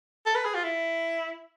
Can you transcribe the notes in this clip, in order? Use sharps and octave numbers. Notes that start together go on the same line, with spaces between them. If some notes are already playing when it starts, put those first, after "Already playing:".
A4
B4
G#4
F4
E4